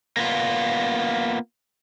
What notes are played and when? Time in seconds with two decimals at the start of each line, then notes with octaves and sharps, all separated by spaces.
0.17 A#3 B3 F4